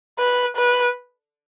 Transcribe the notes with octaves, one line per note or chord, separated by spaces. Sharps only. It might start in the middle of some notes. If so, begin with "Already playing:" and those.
B4
B4